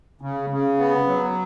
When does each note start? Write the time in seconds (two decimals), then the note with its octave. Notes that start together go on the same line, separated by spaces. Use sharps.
0.21 C#3
0.50 C#3
0.78 B3
1.07 F#3